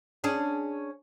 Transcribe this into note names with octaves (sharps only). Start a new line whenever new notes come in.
C#4 D4 G#4